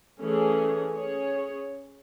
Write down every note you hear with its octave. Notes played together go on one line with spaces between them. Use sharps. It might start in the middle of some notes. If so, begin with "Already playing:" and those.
E3 A3 C#4 G#4
C#4 G#4 C#5